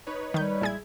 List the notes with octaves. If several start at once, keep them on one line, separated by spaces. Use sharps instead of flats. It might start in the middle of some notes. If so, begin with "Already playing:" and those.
D#4 B4 C#5
D#3 G3 G6
A#1 G#3 E4 G#4 G#6